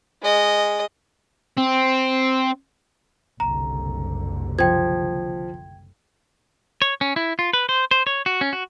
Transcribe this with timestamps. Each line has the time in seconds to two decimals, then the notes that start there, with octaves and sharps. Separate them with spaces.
0.22 G#3 D#5
1.58 C4
3.40 F#1 C2 D3 A#5
4.59 F3 G5 G#6
6.82 C#5
7.01 C#4
7.16 E4
7.39 F4
7.53 B4
7.69 C5
7.91 C5
8.07 C#5
8.26 F#4
8.41 C#4
8.53 F#4